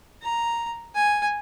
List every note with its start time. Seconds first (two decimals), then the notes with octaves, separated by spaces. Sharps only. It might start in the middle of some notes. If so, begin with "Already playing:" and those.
0.23 A#5
0.95 G#5